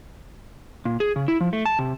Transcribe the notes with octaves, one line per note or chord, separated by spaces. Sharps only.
A#2
G#4
C#3
E4
F3
A3
A5
C3